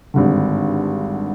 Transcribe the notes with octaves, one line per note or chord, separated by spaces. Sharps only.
G#1 G2 D3